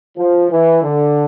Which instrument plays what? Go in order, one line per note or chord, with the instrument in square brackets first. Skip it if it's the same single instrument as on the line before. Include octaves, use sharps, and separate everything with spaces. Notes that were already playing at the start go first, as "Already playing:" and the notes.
[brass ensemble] F3
E3
D3